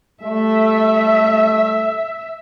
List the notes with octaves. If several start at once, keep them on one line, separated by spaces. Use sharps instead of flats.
G3 A3 E5